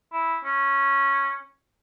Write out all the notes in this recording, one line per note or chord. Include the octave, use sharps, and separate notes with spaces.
E4
C#4